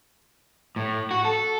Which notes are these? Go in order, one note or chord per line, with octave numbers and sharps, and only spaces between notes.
A2
F#4
A4